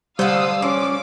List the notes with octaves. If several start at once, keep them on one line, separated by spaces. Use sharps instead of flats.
D3 G3 C5 F5 D#6 E6
F3 C#4 D6